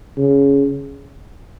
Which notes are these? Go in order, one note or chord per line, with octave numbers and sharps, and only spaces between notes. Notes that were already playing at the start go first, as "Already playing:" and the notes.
C#3